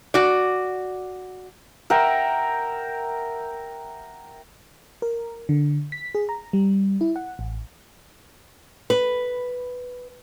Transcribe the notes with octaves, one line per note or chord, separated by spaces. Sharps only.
F#4 D5
A#4 E5 F#5 G5
A#4
D3
B6
G#4
A#5
G3
E4
F#5
A1
B4